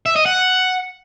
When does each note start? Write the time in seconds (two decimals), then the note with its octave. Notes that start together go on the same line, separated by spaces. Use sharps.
0.06 E5
0.16 D#5
0.26 F#5